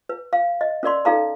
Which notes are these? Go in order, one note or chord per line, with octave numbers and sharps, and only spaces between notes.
B4
F5
D#5
C#4 A#4 D5 C6
D#4 A4 F5 A#5